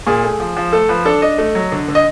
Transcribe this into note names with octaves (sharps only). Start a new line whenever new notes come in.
A#2 G#4
A3
F3
F3
A3 A4
F3 B4
D4 A4
D4 D#5
A3
F#3
D3
D3
D#5